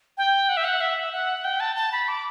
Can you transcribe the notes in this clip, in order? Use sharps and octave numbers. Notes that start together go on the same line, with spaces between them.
G5
F#5
E5
F#5
E5
F#5
G5
A5
A5
B5
D6